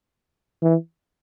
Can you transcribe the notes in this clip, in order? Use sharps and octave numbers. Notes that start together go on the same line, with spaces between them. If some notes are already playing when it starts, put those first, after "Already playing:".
E3